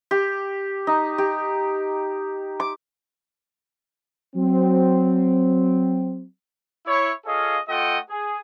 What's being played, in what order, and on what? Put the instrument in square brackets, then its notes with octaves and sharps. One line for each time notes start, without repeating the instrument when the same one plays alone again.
[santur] G4
D#4
G4
D6
[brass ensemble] F#3 C4
[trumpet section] E4 C#5
F4 G#4 A4 C#5 D#5 F5
A3 F4 A4 D#5 F#5 G5
G#4